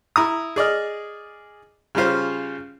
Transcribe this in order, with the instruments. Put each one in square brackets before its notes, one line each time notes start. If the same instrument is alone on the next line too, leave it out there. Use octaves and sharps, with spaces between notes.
[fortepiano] E4 A#5 D#6
G#4 D5 D#5 F6
C#3 G3 C#4 F4 C5